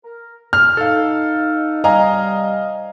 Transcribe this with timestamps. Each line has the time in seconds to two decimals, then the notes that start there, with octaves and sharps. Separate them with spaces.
0.04 A#4
0.53 D2 B2 F6
0.77 D#4 A4 F5
1.84 C3 G3 D#5 F5 G#5 A#5